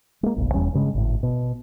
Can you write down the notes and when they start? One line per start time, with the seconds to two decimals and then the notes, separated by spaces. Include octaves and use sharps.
0.23 G#3 A#3
0.36 F#1 B1 B2
0.54 F1 E2 G3 C#4
0.74 G2 C#3 G#3
0.95 G#1 A2
1.23 B2